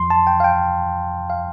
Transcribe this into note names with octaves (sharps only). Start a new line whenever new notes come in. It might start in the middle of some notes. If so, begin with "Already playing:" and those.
Already playing: F2 F3 C6
A5
G5
F5
G5
F5